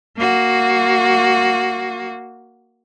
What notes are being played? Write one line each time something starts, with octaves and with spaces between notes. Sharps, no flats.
A#3 F#4